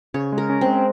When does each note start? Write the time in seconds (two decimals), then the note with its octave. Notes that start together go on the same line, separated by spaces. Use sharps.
0.14 C#3 C#5
0.32 G#3
0.38 A#4
0.49 C#4
0.61 G#3 C4